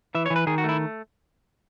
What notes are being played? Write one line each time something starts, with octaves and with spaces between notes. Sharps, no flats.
E3 E5
C#5
E3
B4
D#3 G#4
F#4
A3 E4